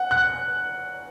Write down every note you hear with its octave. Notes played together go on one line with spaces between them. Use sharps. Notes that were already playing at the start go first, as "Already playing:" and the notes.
Already playing: F#5
F#6